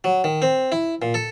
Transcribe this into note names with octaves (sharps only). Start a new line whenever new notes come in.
F#3
D#3
C4
E4
A#2
A4